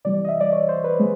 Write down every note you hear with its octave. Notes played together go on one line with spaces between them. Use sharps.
C3 E3 G3 D5
D#5
E5
D5
C#5
C5
B4
G#3